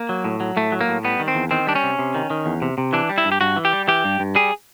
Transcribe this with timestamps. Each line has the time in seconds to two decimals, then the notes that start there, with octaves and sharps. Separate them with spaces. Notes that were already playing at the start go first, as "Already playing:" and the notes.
Already playing: A#3
0.09 F#3
0.24 A2
0.40 F#3
0.57 A2 A3
0.72 F#3
0.81 A#3
0.88 A2
1.04 G3 B3
1.20 D#3
1.28 C4
1.35 E2
1.51 D#3 C4
1.67 G3 D4
1.75 C#4
1.83 C3
1.99 C3
2.15 D#3
2.30 D#3
2.46 E2
2.62 C3
2.78 C3
2.93 E3 D4
3.09 G3
3.18 E4
3.25 G2
3.32 G4
3.41 G2 F#4
3.56 E3
3.65 G4
3.73 G3
3.88 E3 G4
4.04 G2
4.20 G2
4.35 G3 G#4